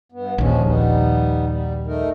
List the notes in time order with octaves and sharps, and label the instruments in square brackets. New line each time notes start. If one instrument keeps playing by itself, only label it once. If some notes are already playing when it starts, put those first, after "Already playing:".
[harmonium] G2 B3
[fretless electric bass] A#1 D#2 [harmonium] F3 G#3 C#4
[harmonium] G3 B3 D#4
G3
A3 D#4 A#4